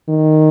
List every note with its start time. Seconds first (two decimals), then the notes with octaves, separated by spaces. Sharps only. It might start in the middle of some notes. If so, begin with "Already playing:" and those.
0.09 D#3